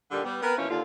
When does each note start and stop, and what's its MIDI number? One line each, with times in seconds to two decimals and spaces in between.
0.11 0.23 46
0.11 0.23 50
0.11 0.23 51
0.11 0.23 55
0.24 0.39 55
0.24 0.39 59
0.42 0.55 59
0.42 0.55 60
0.42 0.55 70
0.42 0.55 71
0.56 0.67 47
0.56 0.67 52
0.56 0.67 53
0.56 0.67 58
0.56 0.67 61
0.56 0.67 64
0.69 0.81 39
0.69 0.81 50
0.69 0.81 65